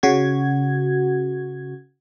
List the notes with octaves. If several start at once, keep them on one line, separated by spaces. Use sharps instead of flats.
C#3 F#4 G#6